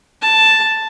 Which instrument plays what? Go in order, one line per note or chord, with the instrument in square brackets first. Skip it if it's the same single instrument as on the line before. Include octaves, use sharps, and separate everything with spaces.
[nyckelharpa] A5